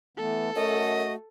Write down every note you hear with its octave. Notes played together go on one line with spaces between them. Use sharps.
E3 A3 B3 A4
F#2 A3 F#4 D#5